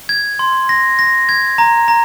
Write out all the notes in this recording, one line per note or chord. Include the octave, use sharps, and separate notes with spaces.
G#6
C6
A#6
A#6
G#6
A#5
A#5